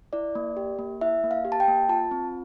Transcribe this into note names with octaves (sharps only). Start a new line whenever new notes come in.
E4 D5
A#3
G4
A#3
E4 E5
A#3
F5
G4
A5
G5
A#3
F4 A5
C4